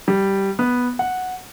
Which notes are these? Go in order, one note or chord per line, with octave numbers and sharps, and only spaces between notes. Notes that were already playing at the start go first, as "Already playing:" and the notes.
G3
B3
F#5